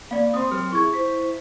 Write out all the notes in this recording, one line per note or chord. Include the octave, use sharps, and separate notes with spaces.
A#3 D5 F5 B5
C4 C5 C6 D#6
F#3 G4 A#4 F6
E4 G#4 C#6 G#6
E4 C5 B6